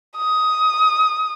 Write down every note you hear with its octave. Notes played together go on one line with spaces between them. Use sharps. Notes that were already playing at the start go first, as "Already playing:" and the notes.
D#6